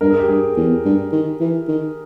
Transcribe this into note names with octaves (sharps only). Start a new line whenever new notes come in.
G2 A#4
G#4
G4
G2 G#4
E2
G2
D#3
E3
D#3